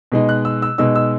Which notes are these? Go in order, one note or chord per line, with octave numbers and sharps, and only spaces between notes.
B2 G#3 D#4
F#6
E6
E6
B2 G#3 D#4 E6
E6